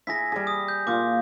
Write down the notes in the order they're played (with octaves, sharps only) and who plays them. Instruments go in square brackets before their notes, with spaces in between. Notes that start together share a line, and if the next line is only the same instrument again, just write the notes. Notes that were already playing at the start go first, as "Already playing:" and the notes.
[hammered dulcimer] E4 G#4 [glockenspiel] A#6 B6
[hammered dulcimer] G3 G#4
[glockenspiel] D#6
G6
[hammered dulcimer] A#2 F4 [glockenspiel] D6 D#6